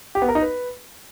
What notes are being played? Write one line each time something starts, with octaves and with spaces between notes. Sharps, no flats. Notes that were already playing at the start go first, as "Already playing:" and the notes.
G4
B3
A#4
D#4
B4